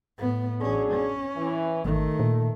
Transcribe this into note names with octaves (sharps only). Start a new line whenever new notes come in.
A2 B3
A1 F#3 C#4 D4 G#4
C#4
E3
G#1 D#3 A3
A#2